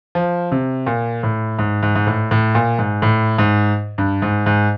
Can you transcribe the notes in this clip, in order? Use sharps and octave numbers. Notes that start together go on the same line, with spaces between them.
F3
C3
A#2
A2
G#2
G#2
G#2
A2
A2
A#2
G#2
A2
G#2
G2
G#2
G#2